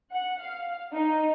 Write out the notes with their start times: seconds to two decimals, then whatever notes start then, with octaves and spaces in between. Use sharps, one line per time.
0.11 F#5
0.41 F5
0.92 D#4